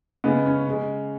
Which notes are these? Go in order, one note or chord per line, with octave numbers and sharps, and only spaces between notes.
C#3 G#3 B3
C#4
C#3 G#3